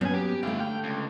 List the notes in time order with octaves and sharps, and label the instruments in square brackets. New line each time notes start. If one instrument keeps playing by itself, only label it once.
[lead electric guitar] A#2 G#5 [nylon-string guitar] F#3 B3 C#4
[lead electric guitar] G4
[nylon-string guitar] D3 A3 [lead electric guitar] E4 F5
[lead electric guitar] G5
C#2